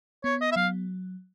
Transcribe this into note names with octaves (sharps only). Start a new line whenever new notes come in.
B3 C#5
D#5
E5
F#3 F5